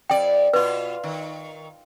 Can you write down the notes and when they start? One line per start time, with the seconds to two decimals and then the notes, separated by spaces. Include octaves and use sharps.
0.10 F2 D5 G5
0.53 B2 F4 B4
1.04 D#3